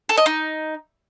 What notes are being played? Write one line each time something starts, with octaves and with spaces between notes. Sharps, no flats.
A4
D#5
D#4